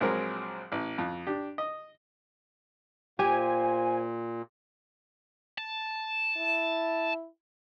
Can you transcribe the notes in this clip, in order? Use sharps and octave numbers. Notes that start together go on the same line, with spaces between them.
A#1 F#3 G#3 C4 A#4
A1
F2
D4 G4
D#5
A#2 F4 G4 C5 G#5
A5
E4